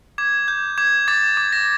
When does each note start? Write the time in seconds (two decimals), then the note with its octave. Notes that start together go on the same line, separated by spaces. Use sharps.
0.18 D6 G#6
0.48 G6
0.78 D6 G#6
1.08 D6 A6
1.37 D6
1.52 A#6